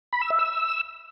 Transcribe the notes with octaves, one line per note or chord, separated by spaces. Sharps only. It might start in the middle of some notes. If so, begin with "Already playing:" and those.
B5
E6
E5
E6